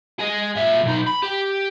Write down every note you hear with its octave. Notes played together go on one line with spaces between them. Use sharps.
G#4 D#5
A#2 E5
B1 D#4
B5
G4